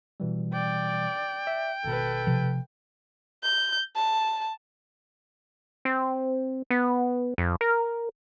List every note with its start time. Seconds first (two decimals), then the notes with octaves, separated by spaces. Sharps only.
0.20 B2 E3 G3
0.53 D5 G5
1.47 E5
1.85 G#1 B2 A4 B4
2.27 C3 F3
3.44 G6
3.96 A5
5.85 C4
6.70 B3
7.38 F2
7.61 A#4